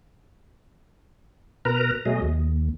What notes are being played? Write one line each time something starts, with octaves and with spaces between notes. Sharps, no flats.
B2 A#4 B4 A#5
B2 F#3 A3 G#4 D#5
D#2